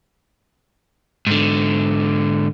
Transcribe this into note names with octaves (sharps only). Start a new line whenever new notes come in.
G#2 D3